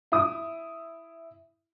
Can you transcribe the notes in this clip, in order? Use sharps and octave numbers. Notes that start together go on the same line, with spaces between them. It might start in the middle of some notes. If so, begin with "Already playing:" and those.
E4 D#6